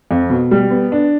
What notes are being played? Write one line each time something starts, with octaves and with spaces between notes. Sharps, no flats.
F2
B2
G3
B3
D4